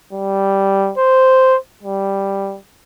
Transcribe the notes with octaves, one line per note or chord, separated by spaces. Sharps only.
G3
C5
G3